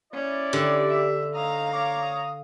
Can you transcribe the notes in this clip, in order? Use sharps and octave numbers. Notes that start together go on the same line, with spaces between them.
C#4 E4 D5
D3 G4
E5
C#4 D#4 F5 A#5 D#6
C#5 A#5 D6
D#6